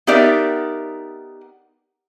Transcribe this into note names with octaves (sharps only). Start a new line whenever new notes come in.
B3 D#4 G4 A#4 D5 E5